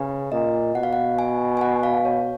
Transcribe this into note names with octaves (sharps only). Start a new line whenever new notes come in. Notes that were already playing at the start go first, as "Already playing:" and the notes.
Already playing: C#3 B4
A#2 D#5
B2 F#5
F5
F#5
G#5
G#5
F#5
F5
C#5